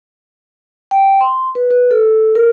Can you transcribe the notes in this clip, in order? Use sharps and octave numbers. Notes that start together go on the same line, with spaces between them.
G5
C6
B4
B4
A4
A#4